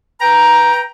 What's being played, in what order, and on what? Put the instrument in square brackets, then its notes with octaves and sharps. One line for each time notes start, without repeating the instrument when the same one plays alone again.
[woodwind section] B4 G5 A#5